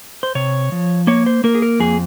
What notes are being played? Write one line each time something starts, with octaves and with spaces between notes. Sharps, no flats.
C5
C3 C#5
F3
A#3 C#5
C5
A#3 A#4
G#4
A#4
F2 G#4